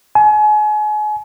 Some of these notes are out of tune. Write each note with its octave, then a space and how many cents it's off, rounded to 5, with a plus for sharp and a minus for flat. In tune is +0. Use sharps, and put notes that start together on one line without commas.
G#5 +35